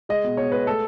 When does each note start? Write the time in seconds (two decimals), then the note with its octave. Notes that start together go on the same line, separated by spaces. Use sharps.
0.09 G#3 D#5
0.24 B2
0.37 B2 C#5
0.52 G#3 B4
0.66 A3 A4